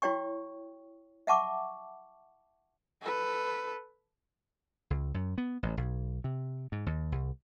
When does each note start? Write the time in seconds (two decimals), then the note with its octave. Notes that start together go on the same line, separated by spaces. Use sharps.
0.02 E4 F#4 C#5 G5 C#6
1.27 E5 F#5 A5 C#6 D6
3.02 A4 B4
4.90 C#2
5.14 F#2
5.38 B3
5.63 A1
5.77 B1
6.24 C3
6.72 G#2
6.86 D#2
7.12 C2